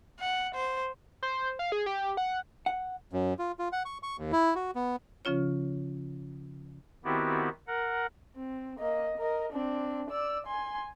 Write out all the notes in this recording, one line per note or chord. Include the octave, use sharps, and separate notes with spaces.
F#5
C5
C5
F5
G#4
G4
F#5
F#5
F#2
F4
F4
F#5
C#6
C#6
D#2
E4
F#4
B3
C#3 F3 C#4 F4 C#5
D#3 B3 C4 E4 F#4 G4
A#4 F#5
C4
A#3 D#5
A#4 D#5
C4 D4
D5 E6
G#5 C6